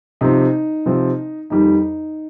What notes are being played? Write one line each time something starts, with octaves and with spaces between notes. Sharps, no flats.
C3 F3 C4 D#4
C3 F3 C4
F2 D#3 G3 D#4